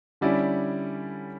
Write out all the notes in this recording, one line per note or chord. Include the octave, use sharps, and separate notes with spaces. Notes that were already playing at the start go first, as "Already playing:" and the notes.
D3 G3 C#4 E4 D5